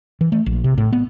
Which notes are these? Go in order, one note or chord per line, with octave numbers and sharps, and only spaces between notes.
E3
A3
A#1
C3
A2
B3